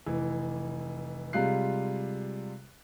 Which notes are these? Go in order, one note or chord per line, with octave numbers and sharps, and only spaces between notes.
F1 E3
C3 G3 G#3 F4 F#6 C7